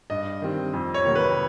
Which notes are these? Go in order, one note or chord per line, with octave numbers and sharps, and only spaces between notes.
G2 D#5
D#3 G3 C4
F2
C#5
C3 D#3 F#3 A#3
B4